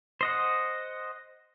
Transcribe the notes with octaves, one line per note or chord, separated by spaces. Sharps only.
C5 D#5 F#5